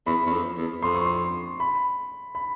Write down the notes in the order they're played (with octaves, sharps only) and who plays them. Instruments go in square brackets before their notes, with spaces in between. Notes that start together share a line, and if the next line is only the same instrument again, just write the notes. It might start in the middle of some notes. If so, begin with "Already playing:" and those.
[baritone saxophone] E2 [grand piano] B5
[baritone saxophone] E2
F2
E2
[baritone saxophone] F2 [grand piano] C6
[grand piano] C#6
C6
B5
B5